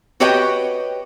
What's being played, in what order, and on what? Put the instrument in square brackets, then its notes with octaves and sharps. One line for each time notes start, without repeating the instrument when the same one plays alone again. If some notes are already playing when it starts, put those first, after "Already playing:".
[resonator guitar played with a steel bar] F#4 G4 B4 C#5 D#5 G5